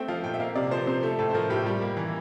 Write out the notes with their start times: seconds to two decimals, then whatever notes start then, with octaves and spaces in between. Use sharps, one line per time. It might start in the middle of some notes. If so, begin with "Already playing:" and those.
Already playing: A3 C4 G5
0.08 F3 F5
0.24 A#2 G5
0.34 E5
0.40 A#3 F5
0.55 C3 D5
0.71 F3 C5
0.87 C3 C5
1.03 A3 A4
1.19 A2 A4
1.30 C5
1.34 F3 A#4
1.50 A2 G4
1.66 G3
1.82 A#3
1.97 E3